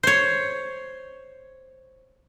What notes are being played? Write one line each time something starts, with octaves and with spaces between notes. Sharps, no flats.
C5 C#5